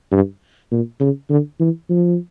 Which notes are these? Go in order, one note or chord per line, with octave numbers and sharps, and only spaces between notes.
G2
A#2
C#3
D3
E3
F3